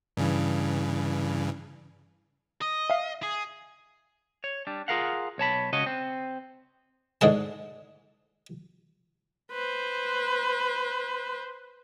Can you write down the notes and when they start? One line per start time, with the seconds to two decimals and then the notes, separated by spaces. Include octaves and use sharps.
0.17 G2 C#3 E3
2.61 D#5
2.90 E5 F5
3.23 G#4
4.44 C#5
4.67 G3 D4
4.88 F4 G#4 A#4 F5 F#5
5.38 B1 C#5 A5 B5
5.73 C#2 C#3 F#4 C#5 D#5
5.86 C4
7.21 G#2 D3 G#3 A5
9.52 B4 C5